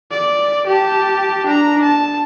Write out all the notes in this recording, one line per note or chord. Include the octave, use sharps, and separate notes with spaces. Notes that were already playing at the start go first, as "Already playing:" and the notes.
D5
G4 A5
D4 A#5
A5